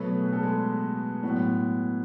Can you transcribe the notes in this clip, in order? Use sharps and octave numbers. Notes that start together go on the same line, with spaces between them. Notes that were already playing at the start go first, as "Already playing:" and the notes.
Already playing: B2 F#3 A3 B3 B4
G#4
A4
G#3 G#4
A2 F#3 B3